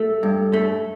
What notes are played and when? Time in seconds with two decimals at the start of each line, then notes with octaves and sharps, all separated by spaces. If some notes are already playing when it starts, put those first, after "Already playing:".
Already playing: A3 A4
0.23 G2
0.53 A3